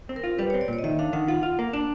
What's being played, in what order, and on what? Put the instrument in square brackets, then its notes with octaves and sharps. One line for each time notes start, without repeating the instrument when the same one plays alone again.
[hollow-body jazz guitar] C4
[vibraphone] A#4
[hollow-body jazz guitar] F4
[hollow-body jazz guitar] G3 [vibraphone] B4
[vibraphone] C#5
[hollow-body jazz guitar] C4
[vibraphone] D5
[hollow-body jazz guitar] A#2 [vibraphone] C#5
[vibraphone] D#5
[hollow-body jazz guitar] D#3 [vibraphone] E5
[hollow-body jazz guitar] D4 [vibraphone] F5
[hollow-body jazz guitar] D#3 [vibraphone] F#5
[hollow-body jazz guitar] F4 [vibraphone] F#5
[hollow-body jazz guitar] F4
A#3
D4